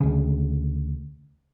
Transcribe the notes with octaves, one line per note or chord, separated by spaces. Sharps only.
D2 C#3